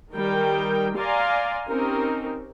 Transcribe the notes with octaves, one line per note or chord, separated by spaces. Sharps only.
D#3 G3 A#4 G5
D5 F5 G#5 A#5 C6
C4 C#4 D#4 G4 A#4